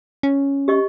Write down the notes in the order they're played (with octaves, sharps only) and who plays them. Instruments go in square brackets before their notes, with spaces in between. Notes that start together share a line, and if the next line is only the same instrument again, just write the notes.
[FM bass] C#4
[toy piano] G4 D#5 C#6